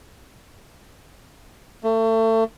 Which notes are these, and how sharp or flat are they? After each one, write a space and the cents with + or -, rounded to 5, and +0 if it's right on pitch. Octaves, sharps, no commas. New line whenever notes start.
A3 +30